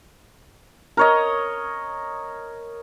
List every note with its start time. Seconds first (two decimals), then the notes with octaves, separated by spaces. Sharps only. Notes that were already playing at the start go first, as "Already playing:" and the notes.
0.97 A#4 C#5 D#5